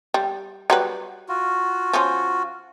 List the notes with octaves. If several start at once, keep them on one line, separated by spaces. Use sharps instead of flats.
G3
F#3 G3 B4
F4 F#4
F3 C#4